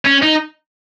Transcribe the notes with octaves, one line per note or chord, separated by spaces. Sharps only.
C#4
D#4